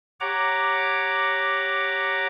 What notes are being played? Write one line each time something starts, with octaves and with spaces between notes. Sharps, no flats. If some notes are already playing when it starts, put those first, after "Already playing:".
G4 C#5 F#5 A#5 D6